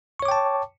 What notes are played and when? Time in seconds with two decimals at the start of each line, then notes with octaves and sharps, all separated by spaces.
0.19 C#6
0.22 C#5
0.25 D6
0.28 G5
0.31 A5